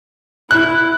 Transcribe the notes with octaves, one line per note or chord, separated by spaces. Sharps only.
E4 F#6